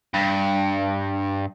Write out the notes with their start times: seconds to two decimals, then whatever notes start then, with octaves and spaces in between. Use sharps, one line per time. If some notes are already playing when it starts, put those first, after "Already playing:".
0.14 G2